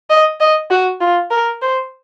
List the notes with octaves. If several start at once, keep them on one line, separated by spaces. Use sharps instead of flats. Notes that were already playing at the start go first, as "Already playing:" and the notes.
D#5
D#5
F#4
F4
A#4
C5